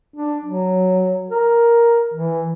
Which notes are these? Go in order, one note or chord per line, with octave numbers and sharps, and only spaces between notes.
D4
F#3
A#4
E3